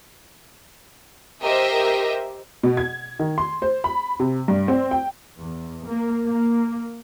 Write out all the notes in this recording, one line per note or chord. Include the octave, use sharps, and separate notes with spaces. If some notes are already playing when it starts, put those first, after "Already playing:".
G4 A#4 C5 D#5 E5 G5
B2
G#6
D#3
C6
C5
B5
C3
G2
C4
G5
E2
A#3
A#3